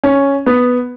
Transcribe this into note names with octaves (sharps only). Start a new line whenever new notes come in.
C#4
B3